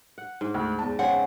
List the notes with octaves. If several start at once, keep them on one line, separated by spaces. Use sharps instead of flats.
F#5
G#2
D2
E2 A5
C#3 C4 F#5